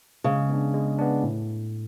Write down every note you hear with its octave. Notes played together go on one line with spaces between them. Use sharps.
C#3 G#3
B3 D4
G#3
B3 D4
A2